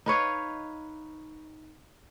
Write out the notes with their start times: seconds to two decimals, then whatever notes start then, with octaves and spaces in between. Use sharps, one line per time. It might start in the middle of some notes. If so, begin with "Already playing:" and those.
0.06 D#4 B4 C#5 F5